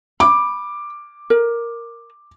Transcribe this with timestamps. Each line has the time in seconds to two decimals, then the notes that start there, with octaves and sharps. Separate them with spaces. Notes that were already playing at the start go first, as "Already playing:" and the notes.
0.20 B5 D6
1.30 A#4